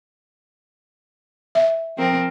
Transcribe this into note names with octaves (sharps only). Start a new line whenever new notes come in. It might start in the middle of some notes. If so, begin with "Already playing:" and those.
E5
F3 C4 A#4